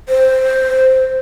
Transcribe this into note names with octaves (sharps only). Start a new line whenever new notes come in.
C5